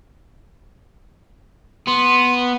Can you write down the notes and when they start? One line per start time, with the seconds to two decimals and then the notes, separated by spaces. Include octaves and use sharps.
1.87 B3 C6